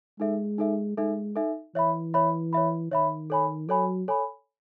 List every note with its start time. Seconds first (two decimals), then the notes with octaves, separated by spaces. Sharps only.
0.19 G#3 D#4 A4 E5
0.58 D#4 A4 E5
0.97 G#3 D#4 A4 E5
1.36 D#4 A4 E5
1.75 E3 C#5 E5 B5
2.14 C#5 E5 B5
2.53 C#5 E5 B5
2.92 D#3 C#5 E5 B5
3.30 A4 C#5 G#5 B5
3.69 F#3 A4 C#5 G#5 B5
4.08 A4 C#5 G#5 B5